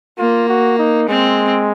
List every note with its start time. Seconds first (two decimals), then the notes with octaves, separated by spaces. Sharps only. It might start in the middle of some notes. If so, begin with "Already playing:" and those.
0.18 A#3 F4
0.49 F#4
0.79 D#4
1.08 G#3 C4